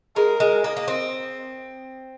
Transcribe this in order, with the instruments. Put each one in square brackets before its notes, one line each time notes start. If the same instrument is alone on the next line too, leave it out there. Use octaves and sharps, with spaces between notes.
[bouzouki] G#3 [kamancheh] A#4
[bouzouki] G#3
[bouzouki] A#3 [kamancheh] D#5
[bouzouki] A#3
C4